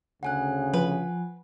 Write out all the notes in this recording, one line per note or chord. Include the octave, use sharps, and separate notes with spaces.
D2 C#3 F#5 G#5 F#6
F3 B4